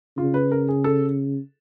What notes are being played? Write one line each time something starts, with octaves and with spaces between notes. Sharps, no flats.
C#3 F4
B4
A#4
G#4
A4